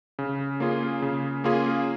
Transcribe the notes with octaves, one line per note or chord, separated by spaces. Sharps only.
C#3
A#3 C#4 F4 G#4
C#3
A#3 C#4 F4 G#4